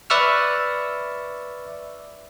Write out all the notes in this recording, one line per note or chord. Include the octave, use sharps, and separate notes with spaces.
B4 D5 E5 C#6 E6 F6